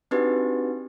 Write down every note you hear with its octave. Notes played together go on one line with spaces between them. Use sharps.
C4 D4 D#4 F#4 G4 B4